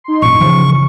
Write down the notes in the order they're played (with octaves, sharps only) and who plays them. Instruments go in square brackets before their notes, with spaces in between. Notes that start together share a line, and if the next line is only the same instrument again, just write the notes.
[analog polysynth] D#4 C6
[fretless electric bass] A1 A#2 [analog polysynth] F#2 [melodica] C#6
[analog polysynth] C#3 [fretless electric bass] E3 F3